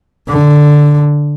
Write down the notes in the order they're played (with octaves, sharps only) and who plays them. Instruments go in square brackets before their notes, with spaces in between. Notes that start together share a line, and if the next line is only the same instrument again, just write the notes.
[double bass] D3